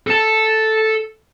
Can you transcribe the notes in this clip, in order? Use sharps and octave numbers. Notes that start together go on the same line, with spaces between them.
A4 A5